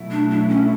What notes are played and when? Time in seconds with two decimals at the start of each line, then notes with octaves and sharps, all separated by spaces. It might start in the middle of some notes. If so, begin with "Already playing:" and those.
Already playing: B2 F#3 A3 E4
0.11 D4
0.30 D4
0.49 C#4